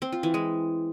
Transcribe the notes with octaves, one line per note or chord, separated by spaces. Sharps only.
C4
F4
E3
G#3